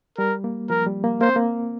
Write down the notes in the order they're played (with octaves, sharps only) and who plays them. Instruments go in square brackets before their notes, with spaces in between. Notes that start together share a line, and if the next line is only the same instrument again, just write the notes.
[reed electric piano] G3 [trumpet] A#4
[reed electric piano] A#3
[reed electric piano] F3 [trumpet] A#4
[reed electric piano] G3
A#3
[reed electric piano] A#3 [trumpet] C5
[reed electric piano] C4
A#3